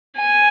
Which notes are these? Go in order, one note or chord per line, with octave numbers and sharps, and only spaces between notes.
G#5